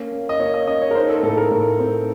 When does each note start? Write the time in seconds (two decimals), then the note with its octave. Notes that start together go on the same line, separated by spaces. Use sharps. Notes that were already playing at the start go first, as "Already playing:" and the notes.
Already playing: A#3 C#4
0.12 C#4
0.29 D#5
0.40 A#3 C#5
0.54 D#5
0.67 C#4 D#5
0.82 C#5
0.91 A#4
0.95 D#4 C5
1.09 A4
1.23 A2 A4
1.37 A#4
1.51 A2
1.79 C4